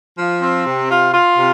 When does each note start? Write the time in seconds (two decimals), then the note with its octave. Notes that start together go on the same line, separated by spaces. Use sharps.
0.18 F3
0.41 C4
0.66 C3
0.90 F4
1.14 F4
1.38 C3